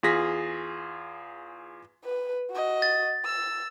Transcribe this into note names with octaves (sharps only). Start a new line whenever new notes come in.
E2 F4 G#4 A#6 B6
B4
F#4 D#5
A6
E6